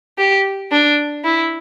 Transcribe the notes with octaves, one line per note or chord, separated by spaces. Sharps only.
G4
D4
E4